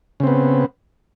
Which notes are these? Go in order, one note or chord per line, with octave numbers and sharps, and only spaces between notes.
C#3 B3 C4